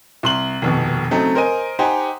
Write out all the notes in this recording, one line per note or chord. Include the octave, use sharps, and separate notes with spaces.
C2 C6 F#7
F1 D#2 B2
C#3 F#3 A3 C4 D#4
A#4 C5 D#5 G#5 D#7
D#4 G4 C5 F#5 G#5 A#5